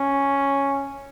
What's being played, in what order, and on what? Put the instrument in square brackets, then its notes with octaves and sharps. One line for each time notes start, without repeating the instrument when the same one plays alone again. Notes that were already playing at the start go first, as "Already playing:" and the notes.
Already playing: [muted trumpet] C#4